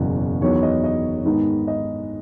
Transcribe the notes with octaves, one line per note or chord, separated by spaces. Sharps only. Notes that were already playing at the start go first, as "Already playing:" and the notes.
Already playing: F#1 E2 B2 F#3 C#4
E2 D#3 F#3 B3 C#5
D#5
D#5
G#2 D#3 G#3 B3
D#5